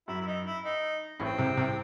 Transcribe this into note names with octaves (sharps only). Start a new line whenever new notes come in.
F#2 E4
E4
D#4
E4
D#4
A1 A2 C4
C2 C3
C2 C3